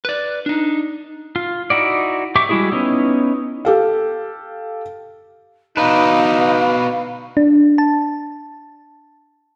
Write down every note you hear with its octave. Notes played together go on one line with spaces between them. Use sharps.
B4 D5
D4 D#4
F4
D#4 E4 F#4 D5
G4 E5 C#6 D6
G3 G#3 E4 F#4 G#4
B3 C#4 D#4 E4
G4 A4 F5
B2 D4 D#4 B4 F5
D4
A5